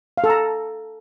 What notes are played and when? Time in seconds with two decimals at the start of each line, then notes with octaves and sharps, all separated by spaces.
0.18 F5
0.24 A4
0.30 A#5